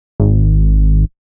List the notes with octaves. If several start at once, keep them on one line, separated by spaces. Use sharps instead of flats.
G#1